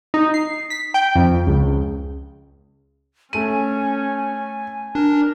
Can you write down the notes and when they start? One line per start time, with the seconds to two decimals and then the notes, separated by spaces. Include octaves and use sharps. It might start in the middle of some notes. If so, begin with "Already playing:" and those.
0.14 D#4
0.34 C7
0.70 B6
0.94 G5
1.16 F2
1.47 C#2
3.33 A3 C#4 G#5 D#7
4.95 D4 A#4